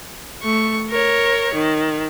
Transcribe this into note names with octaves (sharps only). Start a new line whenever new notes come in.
A3 C#6
A#4 C#5
D#3